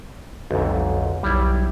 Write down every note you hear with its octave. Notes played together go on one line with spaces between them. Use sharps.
B1 F2 G#2 D3
B1 F#3 G3 E4